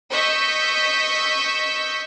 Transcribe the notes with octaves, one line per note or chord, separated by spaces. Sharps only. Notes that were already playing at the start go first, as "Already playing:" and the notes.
D#5 C#6 E6 G6 B6